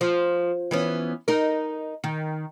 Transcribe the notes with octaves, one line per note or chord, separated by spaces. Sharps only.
F3
E3 B3 C#4
D#4 A#4
D#3